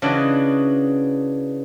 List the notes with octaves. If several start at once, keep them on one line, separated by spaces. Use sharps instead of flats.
C#3 E3 D4 F#4 D#5